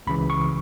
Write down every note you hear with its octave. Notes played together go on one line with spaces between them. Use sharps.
C#2 C#3 E3 B5
C#6